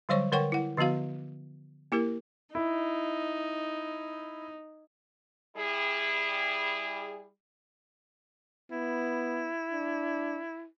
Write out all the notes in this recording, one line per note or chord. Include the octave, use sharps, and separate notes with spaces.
D3 F#3 G3 C5 C#5 C#6
D3 A#4 C#5 F#5 G5 C#6
E4 F#5
D3 F3 B3 F#4 F5
A#3 E4 G4 A#4
D#4 E4
G3 E4 G#4
B3 E4
D4